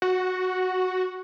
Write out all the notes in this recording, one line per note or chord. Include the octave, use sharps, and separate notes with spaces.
F#4